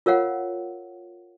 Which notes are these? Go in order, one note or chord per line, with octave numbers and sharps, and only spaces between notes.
F4 A#4 C#5 F5 F#5